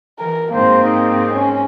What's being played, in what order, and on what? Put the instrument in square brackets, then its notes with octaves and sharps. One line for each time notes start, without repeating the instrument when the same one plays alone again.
[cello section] E3 [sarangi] A#4
[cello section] G#2 G#3 C4 [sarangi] A#3 [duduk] C5
[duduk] D#4
[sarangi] C#4